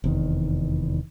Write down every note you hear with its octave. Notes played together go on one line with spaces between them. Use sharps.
F1 E2 D#3